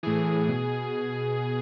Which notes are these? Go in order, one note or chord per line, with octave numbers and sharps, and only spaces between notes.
A2 E3 G#4
B2